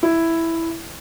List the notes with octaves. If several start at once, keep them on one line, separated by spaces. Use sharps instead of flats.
E4